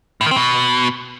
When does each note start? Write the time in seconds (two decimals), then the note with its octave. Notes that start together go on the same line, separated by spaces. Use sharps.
0.21 A2
0.26 D#3
0.31 C4
0.36 B2